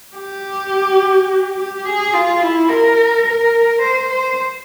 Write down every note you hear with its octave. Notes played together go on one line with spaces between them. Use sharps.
G4
G4
G#4
F4
E4
A#4
A#4
C5
C5